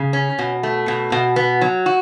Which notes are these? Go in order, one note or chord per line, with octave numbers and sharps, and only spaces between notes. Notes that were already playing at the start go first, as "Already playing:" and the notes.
Already playing: C#3
C#4
B2
A3
B2
B2
B3
F#3
F#4